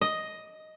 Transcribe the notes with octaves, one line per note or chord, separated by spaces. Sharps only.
D#5